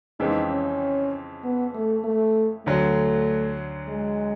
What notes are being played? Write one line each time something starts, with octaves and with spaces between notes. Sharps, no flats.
F2 C#3 E3 G#3 C4 D#4
C#4
B3
A3
A3
D2 D3 F#3 A3
G#3